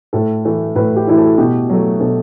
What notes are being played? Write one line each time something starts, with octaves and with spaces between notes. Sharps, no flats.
A2 A4
E3 A3 E4
A2 B4
G4
E3 A3 E4
A4
B2 G4
F#3 A3
B2 A4